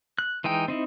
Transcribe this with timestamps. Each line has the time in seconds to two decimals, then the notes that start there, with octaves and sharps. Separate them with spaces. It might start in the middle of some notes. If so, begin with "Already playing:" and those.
0.19 F#6
0.44 E3 G#3 D#4 G5
0.68 C4 D#4 E4